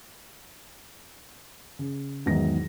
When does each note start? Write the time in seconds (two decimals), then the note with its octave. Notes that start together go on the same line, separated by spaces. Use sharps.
1.79 C#3
2.26 E2 G#2 D#3 E3 F#3 A#6